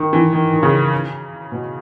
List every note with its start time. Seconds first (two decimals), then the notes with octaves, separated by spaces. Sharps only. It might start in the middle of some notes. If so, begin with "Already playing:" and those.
Already playing: D#3
0.13 E3
0.32 D#3
0.53 D#3
0.63 C#3
1.52 B2